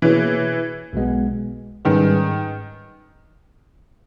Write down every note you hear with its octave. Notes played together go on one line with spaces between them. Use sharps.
B2 E3 A#3 E4 G#4 C#5
B1 B2 G#3 B3
G#2 D#3 G3 C#4 G#4 B4